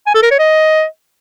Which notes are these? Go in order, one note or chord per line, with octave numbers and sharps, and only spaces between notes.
G#5
A4
A#4
C#5
D#5